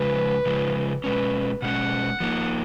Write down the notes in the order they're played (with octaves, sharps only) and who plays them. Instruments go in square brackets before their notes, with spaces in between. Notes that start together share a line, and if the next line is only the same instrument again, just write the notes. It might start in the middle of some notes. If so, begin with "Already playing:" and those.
Already playing: [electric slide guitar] C#3 F3 G#3 [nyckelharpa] B4
[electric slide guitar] C#3 F3 G#3
[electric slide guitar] B2 G#3 C#4 [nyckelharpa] B4
[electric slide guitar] B2 G#3 C#4 [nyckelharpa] F#5
[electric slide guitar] F3 A#3 D#4